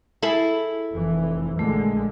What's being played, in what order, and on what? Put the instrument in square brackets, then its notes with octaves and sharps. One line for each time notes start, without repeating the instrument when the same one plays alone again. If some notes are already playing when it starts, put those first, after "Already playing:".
[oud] E4 G#4 A4
[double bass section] F1 E3
[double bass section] A#1 D3 G#3 [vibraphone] A3